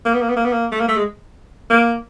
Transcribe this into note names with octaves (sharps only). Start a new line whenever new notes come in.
A#3
B3
A#3
B3
A#3
B3
A#3
A3
A#3
A3
G#3
A#3